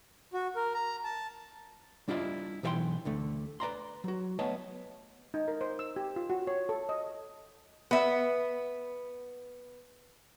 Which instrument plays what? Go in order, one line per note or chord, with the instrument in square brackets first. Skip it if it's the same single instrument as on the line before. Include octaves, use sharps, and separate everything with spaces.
[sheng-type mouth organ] F#4
A#4
A#5
A5
[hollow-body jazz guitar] G3 D4 E4 F4 D5 D#5
B1 E3 B4 E5 G5 C6
D2 D3 A3
B4 D5 A#5 C6
F#3 F#4
A3 B3 C#5 D#5 A5
[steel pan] D#4
A#4
C5
E6
G4
F4
F#4
C#5
A4
D#5
[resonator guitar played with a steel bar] B3 E5